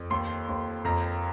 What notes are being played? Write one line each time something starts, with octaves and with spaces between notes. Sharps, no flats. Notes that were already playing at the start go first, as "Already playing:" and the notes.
Already playing: F2
D#2 C6
D#2
F2 A#5